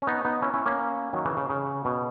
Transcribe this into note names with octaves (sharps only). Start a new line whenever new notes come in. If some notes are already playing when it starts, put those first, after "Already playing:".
C#4
B3 D#4
B3 D#4
C#4 E4
C#4 E4
A#3 C#4
D#3 F#3
C#3 E3
C#3
C#3
B2